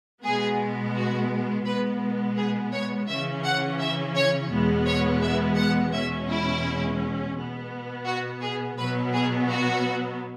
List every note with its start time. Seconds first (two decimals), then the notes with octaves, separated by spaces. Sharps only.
0.23 B2 G#3 B3 G#4
0.94 F#4
1.66 B2 G#3 B3 B4
2.37 G#4
2.73 C#5
3.09 C#3 E3 C#4 E5
3.44 F#5
3.80 E5
4.15 C#5
4.51 E2 B2 G#3 B3
4.86 C#5
5.22 E5
5.57 F#5
5.93 E2 B2 G#3 C#4 E5
6.28 E4
7.35 B2 B3
8.06 F#4
8.42 G#4
8.77 B2 F#3 B3 B4
9.13 G#4
9.50 F#4